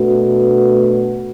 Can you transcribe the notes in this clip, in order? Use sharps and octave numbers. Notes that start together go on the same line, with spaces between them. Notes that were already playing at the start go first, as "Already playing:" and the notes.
Already playing: B2 A3 D4 F#4 B4